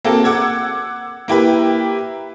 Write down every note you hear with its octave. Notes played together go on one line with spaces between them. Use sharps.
A#3 C4 F#4 G#4 A4
F#5 D6 E6 G#6
A#3 E4 G4 B4